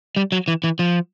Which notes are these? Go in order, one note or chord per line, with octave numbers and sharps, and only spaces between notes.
G3
F#3
E3
E3
F3